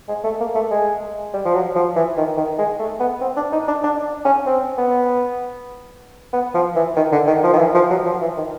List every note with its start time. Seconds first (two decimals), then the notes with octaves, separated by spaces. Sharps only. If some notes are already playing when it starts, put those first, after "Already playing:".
0.09 G#3
0.24 A3
0.40 A#3
0.55 A3
0.71 G#3
1.34 G3
1.45 F3
1.54 F#3
1.75 F3
1.96 E3
2.17 D#3
2.38 D#3
2.58 G#3
2.80 A3
3.00 B3
3.21 C4
3.37 D4
3.53 D#4
3.68 D4
3.84 D4
4.25 C#4
4.46 C4
4.78 B3
6.33 B3
6.55 F3
6.76 E3
6.96 D#3
7.12 D3
7.27 D#3
7.44 F3
7.53 D#3
7.59 E3
7.75 F3
7.90 F#3
8.06 F3
8.21 E3
8.37 D#3